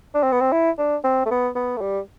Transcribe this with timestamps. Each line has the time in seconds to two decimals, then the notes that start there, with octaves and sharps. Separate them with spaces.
0.15 D4
0.23 C4
0.32 B3
0.41 C4
0.53 E4
0.78 D4
1.04 C4
1.26 A3
1.31 B3
1.55 B3
1.77 A3
1.81 G3